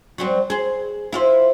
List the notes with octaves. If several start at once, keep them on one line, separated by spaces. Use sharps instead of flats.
F#3 G3 C4
G#4 C5
E4 F4 C5